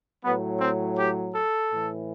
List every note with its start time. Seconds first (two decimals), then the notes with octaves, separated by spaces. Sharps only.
0.23 A2 F#3 B3
0.60 C4
0.98 G4
1.35 A4
1.71 A2 E3